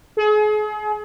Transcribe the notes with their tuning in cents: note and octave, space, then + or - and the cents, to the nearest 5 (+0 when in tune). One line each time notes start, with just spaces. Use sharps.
G#4 +35